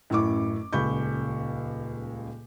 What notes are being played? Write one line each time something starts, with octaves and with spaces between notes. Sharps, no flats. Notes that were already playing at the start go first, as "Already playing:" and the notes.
A1 F#2 E4 C#6 D6
D#1 C#2 B5 C#6 G6